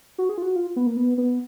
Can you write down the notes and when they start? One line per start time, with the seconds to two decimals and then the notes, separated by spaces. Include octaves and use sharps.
0.18 F#4
0.29 G#4
0.38 F4
0.42 F#4
0.56 F4
0.76 B3
0.87 A#3
0.97 B3
1.18 B3